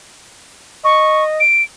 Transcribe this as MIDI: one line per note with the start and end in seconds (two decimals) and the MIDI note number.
0.85 1.42 75
0.85 1.24 85
1.40 1.63 98